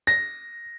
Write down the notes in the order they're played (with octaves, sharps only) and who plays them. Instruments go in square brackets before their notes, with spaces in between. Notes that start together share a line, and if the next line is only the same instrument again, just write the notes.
[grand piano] A#6